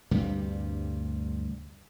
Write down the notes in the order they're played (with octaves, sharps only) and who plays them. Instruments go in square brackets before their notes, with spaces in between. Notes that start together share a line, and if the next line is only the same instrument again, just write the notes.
[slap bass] D2 G2 C3 G3